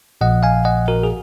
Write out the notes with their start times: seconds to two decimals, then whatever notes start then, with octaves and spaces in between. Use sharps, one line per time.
0.21 A#1 A#2 F3 D#5 F#5
0.43 F5 G#5
0.65 D#5 F#5
0.88 F#4 A#4
1.03 G#4